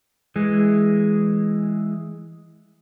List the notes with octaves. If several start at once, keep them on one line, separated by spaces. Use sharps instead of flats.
E3 G#3